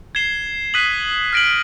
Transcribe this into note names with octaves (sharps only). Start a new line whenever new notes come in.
G#6 C7 E7 G7
D#6 F#6 B6 D#7 F#7
F6 A#6 D7 F#7